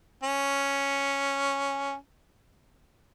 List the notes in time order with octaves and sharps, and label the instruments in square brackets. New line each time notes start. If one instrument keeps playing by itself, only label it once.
[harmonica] C#4